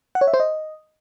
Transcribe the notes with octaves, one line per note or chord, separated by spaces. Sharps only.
F#5
C#5
E5
C5
D#5